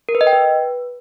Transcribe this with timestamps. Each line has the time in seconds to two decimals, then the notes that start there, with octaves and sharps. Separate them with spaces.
0.09 A#4
0.15 B4
0.21 D#5
0.27 G5
0.33 B4